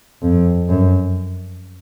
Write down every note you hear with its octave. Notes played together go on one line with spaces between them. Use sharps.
F2
F#2